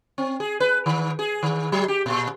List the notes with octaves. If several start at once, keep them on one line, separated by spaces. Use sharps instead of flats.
C4
G#4
B4
D#3
G#4
D#3
F#3
G4
A#2